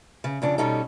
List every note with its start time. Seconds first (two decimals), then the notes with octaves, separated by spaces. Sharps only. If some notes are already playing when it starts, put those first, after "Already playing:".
0.24 C#3
0.42 F2 C#3 D4
0.58 B2 G3 C#4 D#4 A4